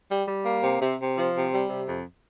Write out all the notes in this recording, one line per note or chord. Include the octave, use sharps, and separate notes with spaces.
G3
G3
A#3
C3
C3
C3
F3
C3
G3
C3
F2